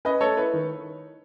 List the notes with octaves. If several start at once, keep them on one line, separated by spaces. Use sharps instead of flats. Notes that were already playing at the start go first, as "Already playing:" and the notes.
C#4 B4 D#5
A3 A4 C#5
E4 B4
D#3